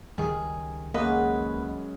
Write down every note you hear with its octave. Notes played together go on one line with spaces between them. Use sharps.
C#2 D#3 G3 G#4
F#2 G#3 A#3 B4 D#5